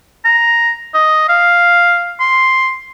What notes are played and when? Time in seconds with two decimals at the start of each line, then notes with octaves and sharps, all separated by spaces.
0.25 A#5
0.94 D#5
1.29 F5
2.20 C6